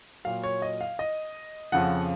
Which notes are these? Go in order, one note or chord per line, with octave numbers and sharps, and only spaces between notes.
A#2 F#3 F5
C#5
D#5
F5
D#5
F2 C#3 F3 F#5